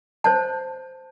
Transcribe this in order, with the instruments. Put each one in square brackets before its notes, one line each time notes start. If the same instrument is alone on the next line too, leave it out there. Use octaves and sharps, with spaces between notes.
[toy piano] C5 C#5 A5